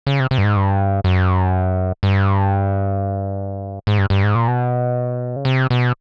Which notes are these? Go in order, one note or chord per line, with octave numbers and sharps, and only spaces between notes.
C#3
C3
C3
G2
G#2
G2
F#2
G2
G#2
G2
G2
G#2
A#2
B2
C#3
C3
B2